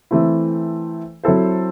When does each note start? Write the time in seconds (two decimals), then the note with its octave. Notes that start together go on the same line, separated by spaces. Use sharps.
0.11 E3 A3 C4 E4
1.24 F#3 C4 E4 A4 C5